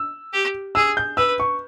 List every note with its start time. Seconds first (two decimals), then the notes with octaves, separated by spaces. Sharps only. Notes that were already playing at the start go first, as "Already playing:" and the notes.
Already playing: E6
0.33 G4
0.75 G#4 E6
0.97 G6
1.17 B4 E6
1.40 C#6